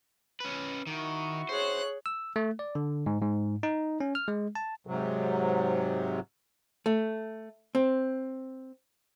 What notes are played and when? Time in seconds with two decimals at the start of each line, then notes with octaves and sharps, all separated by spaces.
0.40 C#4 B4
0.87 D#3 E4 F#4 C#6
1.49 G#4 C5 C#5 F#6
2.06 E6
2.36 A3
2.59 D5
2.75 D3
3.06 G#2
3.22 G#2
3.63 D#4
4.00 C#4
4.15 F6
4.28 G#3
4.55 A5
4.87 G#2 C3 F#3
6.86 A3
7.75 C4